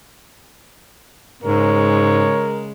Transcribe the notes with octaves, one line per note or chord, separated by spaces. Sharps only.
G#2 C#3 G#3 A#4 C#5